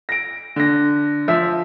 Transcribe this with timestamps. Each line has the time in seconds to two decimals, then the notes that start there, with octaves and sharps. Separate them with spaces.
0.09 A#6 D7
0.56 D3 A#6
1.28 F3 E5